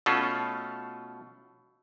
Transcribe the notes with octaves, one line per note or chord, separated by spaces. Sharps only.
B2 A3 C#4 F4 A4